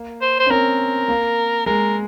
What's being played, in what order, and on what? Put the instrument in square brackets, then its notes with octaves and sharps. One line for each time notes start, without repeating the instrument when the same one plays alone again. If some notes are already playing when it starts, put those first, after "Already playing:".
Already playing: [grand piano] A#3
[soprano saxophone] C5
C5
[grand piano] C#4
[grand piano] C4 [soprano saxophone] A#4
[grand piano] A#3
[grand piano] G#3 [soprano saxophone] A#4